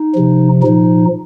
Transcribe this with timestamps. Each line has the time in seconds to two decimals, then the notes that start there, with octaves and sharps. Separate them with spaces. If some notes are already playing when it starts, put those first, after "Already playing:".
Already playing: D#4
0.15 C3 F3
0.62 A#2 F3 D#4